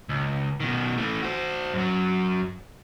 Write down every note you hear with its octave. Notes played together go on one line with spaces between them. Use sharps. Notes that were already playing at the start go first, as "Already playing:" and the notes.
C#2
B2 D#3
E3 A3
F#4 C5
F#2 F#3